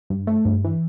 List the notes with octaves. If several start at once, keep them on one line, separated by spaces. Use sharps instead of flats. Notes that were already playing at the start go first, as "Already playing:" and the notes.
G2
A3
G2
E3